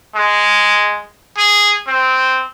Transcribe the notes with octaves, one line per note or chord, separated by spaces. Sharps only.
G#3
G#4
C4